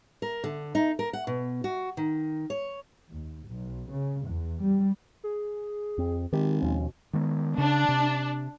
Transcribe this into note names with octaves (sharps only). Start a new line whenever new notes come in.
A#4
D3
D#4
A#4
F#5
B2
F#4
D#3
C#5
D#2
B1
C#3
E2
G3
G#4
F2 C4
G#1 D#3 G4
D#2 B2 F3 C#4
D#3 G#3 B3
C#3 D4
C3